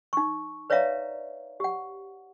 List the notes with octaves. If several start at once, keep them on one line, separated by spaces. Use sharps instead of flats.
D#4 C#6
B4 C#5 D5 E5 F5 A#5
G4 F#5